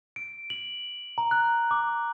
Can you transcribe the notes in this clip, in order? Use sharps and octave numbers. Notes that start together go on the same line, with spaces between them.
D7
F#7
A#5
F#6
D6